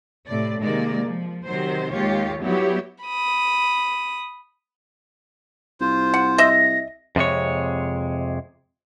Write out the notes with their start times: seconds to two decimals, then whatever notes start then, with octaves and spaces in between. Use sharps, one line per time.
0.25 A2 C3 D5
0.61 C3 D#3 G#3 A#3 D5
1.03 F3
1.45 C3 D#3 F#3 C5
1.92 D#2 G#3 F4 G4 C#5
2.40 F#3 G3 B3 E4 G4 C#5
3.04 B5 D#6
5.80 C2 F4 C5
6.14 F#5
6.38 D#5 E5 A#6
7.16 F2 C3 G#3 C#5